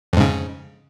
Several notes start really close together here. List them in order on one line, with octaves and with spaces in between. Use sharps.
F2 G#2 C#3